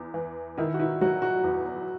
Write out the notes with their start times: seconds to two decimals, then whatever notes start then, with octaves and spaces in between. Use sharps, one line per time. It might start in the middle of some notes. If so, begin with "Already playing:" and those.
Already playing: E2
0.14 E3
0.58 D#3 E4
0.74 F#4
0.80 E4
1.01 F#3 F#4
1.22 F#4
1.44 E2